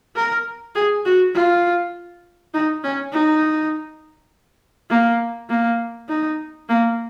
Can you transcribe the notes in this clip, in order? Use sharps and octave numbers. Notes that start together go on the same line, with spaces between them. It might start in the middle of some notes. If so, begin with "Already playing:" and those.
A#4
G#4
F#4
F4
D#4
C#4
D#4
A#3
A#3
D#4
A#3